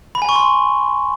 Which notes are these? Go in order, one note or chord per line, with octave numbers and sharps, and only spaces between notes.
B5
G#5
C#6
C6